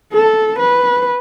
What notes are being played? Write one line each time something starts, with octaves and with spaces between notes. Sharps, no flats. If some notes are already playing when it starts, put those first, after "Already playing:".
A4
B4